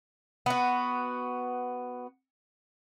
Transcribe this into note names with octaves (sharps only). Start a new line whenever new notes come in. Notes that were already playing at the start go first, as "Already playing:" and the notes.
B3 F#4